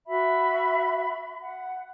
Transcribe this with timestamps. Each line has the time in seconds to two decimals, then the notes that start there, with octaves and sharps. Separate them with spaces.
0.07 F#4 E5 B5
1.40 F#5